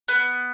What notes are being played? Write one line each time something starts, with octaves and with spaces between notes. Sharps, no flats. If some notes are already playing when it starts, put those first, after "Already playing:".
B3